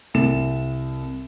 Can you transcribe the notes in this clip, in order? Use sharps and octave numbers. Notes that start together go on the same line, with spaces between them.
C2 E7